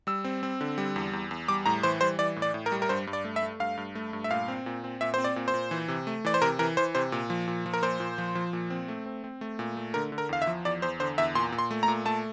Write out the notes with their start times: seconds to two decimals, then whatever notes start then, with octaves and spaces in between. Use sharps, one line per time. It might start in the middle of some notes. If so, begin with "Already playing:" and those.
0.07 G3 E6
0.24 C4
0.43 C4
0.61 D3
0.78 G3
0.96 E2
1.13 E2
1.31 E2
1.48 G3 D6
1.66 A2 A#5
1.83 E3 C5
2.01 G3 C5
2.19 E3 D5
2.36 A2
2.42 D5
2.54 A2
2.66 A#4
2.72 G3
2.82 A#4
2.89 G2 C5
3.07 G2
3.13 D5
3.24 A3
3.36 E5
3.42 A3
3.60 G2 F5
3.77 G2
3.95 A3
4.13 G2
4.24 E5
4.31 A#2 F5
4.48 C4
4.66 A#2
4.84 C4
5.01 A#2 E5
5.14 C4 C5
5.24 D5
5.36 A#2
5.48 C5
5.54 A#2
5.71 E3
5.88 C3
6.07 A3
6.25 E3 D5
6.34 C5
6.42 C3 A#4
6.59 E3 A#4
6.77 E3 C5
6.95 C3 C5
7.12 A#2
7.30 F3
7.48 A#2
7.66 F3
7.74 A#4
7.82 A#2 C5
8.00 A#2
8.18 F3
8.35 F3
8.53 A#2
8.70 C4
8.88 A3
9.06 C4
9.24 C4
9.41 A3
9.59 A#2
9.77 A3
9.94 D3 A#4
10.12 D3
10.18 A#4
10.29 E2 F5
10.42 E5
10.47 F3
10.65 E2 D5
10.82 E2 C5
11.00 D3 C5
11.18 E2 E5
11.35 A#2 C6
11.52 A#2
11.58 C6
11.71 A3
11.83 A#5
11.88 A#2
12.05 A3 A5